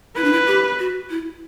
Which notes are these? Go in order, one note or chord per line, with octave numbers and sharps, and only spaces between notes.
E4 B4
D4
E4
G4
F#4
E4